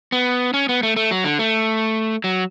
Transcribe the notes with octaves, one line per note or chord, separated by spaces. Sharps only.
B3
C#4
B3
A3
A3
F#3
D3
A3
F#3